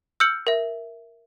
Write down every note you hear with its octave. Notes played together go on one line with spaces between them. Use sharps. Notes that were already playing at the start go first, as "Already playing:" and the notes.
E6 F6 G6 C#7 F#7
A#4 E5